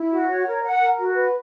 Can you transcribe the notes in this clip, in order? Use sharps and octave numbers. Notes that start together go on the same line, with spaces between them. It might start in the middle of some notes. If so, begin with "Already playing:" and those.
Already playing: E4
F#4
C#5
A#4
F#5
A#4
F#4
B4